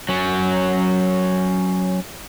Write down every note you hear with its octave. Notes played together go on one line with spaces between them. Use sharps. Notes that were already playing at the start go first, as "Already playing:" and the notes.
F#3 C#4